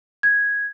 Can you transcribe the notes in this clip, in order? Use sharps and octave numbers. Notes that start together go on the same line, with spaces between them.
G#6